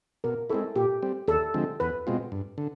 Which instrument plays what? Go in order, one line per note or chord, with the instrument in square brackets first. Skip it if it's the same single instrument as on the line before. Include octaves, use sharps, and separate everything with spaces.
[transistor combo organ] B2 [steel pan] A#4
[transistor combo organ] G#3 C4 E4 [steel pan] A4
[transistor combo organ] A#2 [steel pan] G4
[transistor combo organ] G3 C4
[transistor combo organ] D#2 [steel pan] A4
[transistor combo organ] D3 F3 G#3 C4
[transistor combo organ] E2 [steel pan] B4
[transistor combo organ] B2 G#3 C4 F4
G2
D3